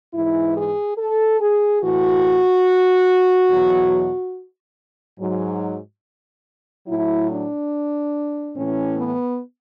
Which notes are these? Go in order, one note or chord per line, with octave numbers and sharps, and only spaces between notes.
G#2 E3 E4
G#4
A4
G#4
A2 E3 F#4
E2 B2 F#3
G#2 F#3
A2 F#3 E4
D4
A2 E3 C#4
B3